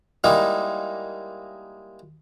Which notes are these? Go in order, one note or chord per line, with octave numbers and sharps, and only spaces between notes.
G3 G#3 A#3 D#4 E4